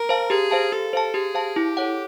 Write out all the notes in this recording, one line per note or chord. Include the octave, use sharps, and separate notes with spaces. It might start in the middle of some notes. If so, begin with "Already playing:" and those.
Already playing: A#4
C5 F5 A5
G4 G#4
C5 F5 A5
G4 A4
C5 F5 A5
G4 G#4
C5 F5 A5
E4 G4
A4 C#5 F#5